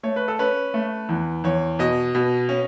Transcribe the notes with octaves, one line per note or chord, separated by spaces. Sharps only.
A3 C#5
B4
A4
C#4 B4
A3
E2
E2 C#5
B2 D#5
B2
C#4